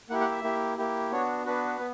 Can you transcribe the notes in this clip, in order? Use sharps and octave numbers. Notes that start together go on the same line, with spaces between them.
A#3 E4 G4 F#5
F#5
E5
A#3 E4 G4
A#3 E4 G4
B3 D4 F#4 C#5
B3 D4 F#4 B4
B3